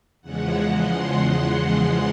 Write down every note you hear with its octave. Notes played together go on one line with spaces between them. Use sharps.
E2 C#3 F3 G#3 F#5
C6